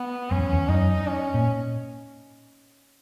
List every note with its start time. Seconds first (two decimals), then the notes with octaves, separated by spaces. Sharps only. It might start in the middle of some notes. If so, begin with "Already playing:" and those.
Already playing: B3
0.31 F#2 C#4
0.38 E2
0.53 E2
0.69 F#2 D#4
1.07 C#4
1.34 A#2